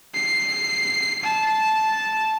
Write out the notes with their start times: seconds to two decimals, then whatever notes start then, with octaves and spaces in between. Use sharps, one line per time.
0.15 C7
1.24 A5